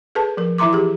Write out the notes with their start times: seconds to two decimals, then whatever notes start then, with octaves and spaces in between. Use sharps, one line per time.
0.15 G#4 A4 B4 A5
0.37 F3 A#4
0.58 E3 E4 E5 A#5 C6 D6
0.73 G4 G#4